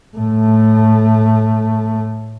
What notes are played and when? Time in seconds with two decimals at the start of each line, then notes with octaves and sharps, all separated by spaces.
0.17 A2 A3